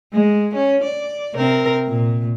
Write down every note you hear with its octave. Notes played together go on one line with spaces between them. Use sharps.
G#3
C#4
D5
C3 C4 A#4
A#2